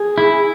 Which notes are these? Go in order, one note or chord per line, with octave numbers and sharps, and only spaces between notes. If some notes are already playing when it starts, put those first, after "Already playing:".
Already playing: G#4
E4